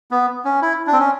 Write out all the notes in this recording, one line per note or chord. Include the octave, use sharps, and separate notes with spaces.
B3
C#4
E4
D4
C4
C#4